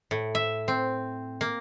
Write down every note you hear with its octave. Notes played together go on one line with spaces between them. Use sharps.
A2
E5
C4
A#3